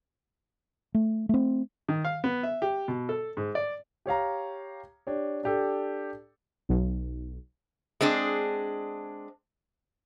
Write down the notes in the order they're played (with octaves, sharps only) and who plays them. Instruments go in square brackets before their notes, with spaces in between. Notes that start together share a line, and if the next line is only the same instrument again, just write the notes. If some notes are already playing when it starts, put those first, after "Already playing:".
[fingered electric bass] A3
A3 C4
[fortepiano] D#3
F5
B3
E5
G4
B2
A4
G#2
D5
[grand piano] G4 C#5 F5 A#5
D4 G4 C#5
D4 G4 A4
[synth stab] B1
[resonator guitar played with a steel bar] G#3 C4 D4 G#4